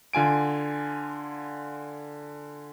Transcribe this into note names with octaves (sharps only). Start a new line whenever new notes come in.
D3 F4 G#5 D7